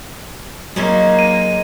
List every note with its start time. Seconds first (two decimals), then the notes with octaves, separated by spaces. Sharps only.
0.76 F#3 G#3 A#3 C#4 D#4
1.19 D#7